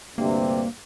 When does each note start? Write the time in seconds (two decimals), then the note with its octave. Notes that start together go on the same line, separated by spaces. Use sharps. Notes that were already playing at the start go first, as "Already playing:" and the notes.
0.18 D2 G2 C3 A#3